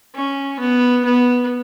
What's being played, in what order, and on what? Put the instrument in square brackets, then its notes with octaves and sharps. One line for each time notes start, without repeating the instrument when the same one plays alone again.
[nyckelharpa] C#4
B3
B3